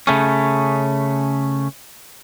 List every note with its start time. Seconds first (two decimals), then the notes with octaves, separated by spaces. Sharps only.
0.07 C#3 A3 C#4